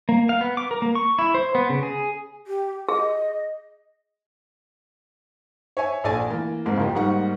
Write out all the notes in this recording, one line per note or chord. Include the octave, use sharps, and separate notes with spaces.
A#3
F5
B3
D6
A#4
A#3
C#6
E4
C5
B3
C#3
G#4
G4
G#4 D#5
C#5 E5 G#5
A#1 A4 D5 G#5 A6
E3 A#3
F2 G#2 G#3 A#3
F#1 F3 G4
G#2 G3 A#3 D#4 F#5 C#6